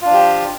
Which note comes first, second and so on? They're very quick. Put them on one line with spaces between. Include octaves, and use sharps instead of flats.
F4 D4 F3 G4